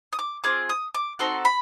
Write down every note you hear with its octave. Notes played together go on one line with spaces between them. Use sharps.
D#6
D6
C4 F4 G#4 D6
D#6
D6
C4 D#4 F#4 A4 C6
B5